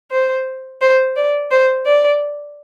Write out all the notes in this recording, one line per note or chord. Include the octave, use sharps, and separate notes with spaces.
C5
C5
D5
C5
D5